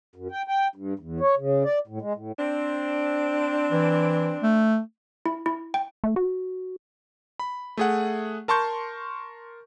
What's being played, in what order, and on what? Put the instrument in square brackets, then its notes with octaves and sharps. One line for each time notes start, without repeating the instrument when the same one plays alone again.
[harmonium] F#2
G5
G5
G2
E2
C#5
C#3
D5
A2
G#3
A2
[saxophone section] C4 D4
[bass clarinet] E3
A3
[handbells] E4
E4
G5
[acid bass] A3
F#4
[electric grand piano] B5
A3 G#4 F#5
A#4 A5 C6 C#6 G6